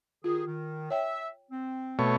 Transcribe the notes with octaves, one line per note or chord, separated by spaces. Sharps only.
D#3 F4 G4 G#4
D#3
C#5 E5 G5
C4
B2 A3 C#5